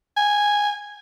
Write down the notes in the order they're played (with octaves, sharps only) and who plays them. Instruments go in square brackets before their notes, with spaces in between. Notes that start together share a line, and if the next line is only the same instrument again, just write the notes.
[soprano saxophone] G#5